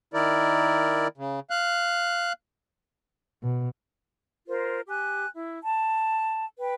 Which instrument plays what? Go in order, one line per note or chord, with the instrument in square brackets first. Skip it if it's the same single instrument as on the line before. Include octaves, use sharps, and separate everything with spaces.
[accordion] D#3 E4 A#4 D5
C#3
F5 F#6
[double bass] B2
[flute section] F4 A#4 C5
G4 G#5 F#6
E4
A5
B4 G5